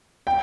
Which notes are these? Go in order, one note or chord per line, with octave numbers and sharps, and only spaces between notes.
G5